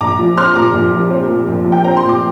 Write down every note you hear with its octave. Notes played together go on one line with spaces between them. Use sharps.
A#1 A#5 D6
F3
C4 C6 F6
A#2 A#5 D6
A#1
F3
C4
A#2
A#1
F3
G5
C4 A#5
C6
A#2
D6